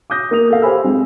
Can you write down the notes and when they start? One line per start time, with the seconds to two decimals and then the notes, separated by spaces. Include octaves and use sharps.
0.10 D6 D#6 G6 A#6
0.31 A#3 D#6 F7
0.50 A4 F5
0.62 G4 C5 F5 G#5 B5 E6
0.84 G#3 C4